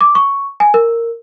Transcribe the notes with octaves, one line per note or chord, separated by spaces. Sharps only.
D6
C#6
G#5
A#4